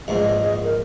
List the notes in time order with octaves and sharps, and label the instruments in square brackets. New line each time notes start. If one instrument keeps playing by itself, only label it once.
[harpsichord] A#1 E2 G#2 [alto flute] D#5
[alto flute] A#4